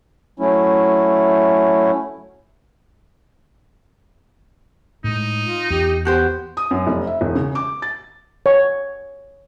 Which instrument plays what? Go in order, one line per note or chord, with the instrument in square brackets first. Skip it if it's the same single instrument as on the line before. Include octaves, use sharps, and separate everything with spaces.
[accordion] F#3 A3 C#4 E4
[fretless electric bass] A2 G#3 [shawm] D#4
[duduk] F4
[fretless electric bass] E2 [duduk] G4
[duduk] B3 [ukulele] F#4 G4 C5
[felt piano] D#6
F#2
F1
E5
E1
C#3
D6
A6
[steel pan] C#5